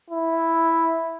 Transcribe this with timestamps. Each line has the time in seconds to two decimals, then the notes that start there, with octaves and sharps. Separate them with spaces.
0.10 E4